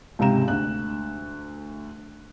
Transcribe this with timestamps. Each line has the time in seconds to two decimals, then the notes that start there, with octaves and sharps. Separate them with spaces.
0.19 C#2 G#2 C3 A#5 E7
0.48 D2 F#6